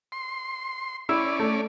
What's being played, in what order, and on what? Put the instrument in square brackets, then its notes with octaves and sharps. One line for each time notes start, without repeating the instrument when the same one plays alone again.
[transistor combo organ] C6
[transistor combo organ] C#4 D5 [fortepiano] E4 E6
[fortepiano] A3